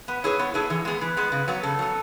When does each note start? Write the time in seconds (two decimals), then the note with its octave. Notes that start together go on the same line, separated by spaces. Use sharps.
0.08 B3 B4
0.24 E4 G#4 B4 C#5
0.39 B3 C#5
0.54 E4 G#4 A4 B4
0.70 E3 G#4
0.85 G#3 B3 G#4
1.01 E3 B4
1.17 G#3 B3
1.32 C#3
1.48 F#3 B3
1.63 C#3 A4
1.79 F#3 B3